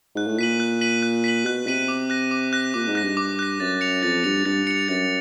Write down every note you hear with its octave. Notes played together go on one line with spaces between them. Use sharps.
G#2 F#6
A2
A#2 B6 D#7 F#7
F#6
B6 D#7 F#7
F#6
B6 D#7 F#7
B2 F#6
C3 B6 D#7 F#7
D6
F#6 A#6
D6
F#6 A#6
A#2 D6
G#2
F#6 A#6
G2
D6
F#6 A#6
F#2 A6
C#7 F7
F2 A6
G2 C#7 F7
G2 A6
C#7 F7
F#2 A6